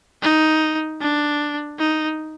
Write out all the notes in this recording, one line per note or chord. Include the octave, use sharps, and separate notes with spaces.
D#4
D4
D#4